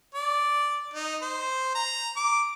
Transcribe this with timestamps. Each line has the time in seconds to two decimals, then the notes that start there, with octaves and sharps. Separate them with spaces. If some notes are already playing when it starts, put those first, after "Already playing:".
0.15 D5
0.94 D#4
1.22 C5
1.75 A#5
2.16 D6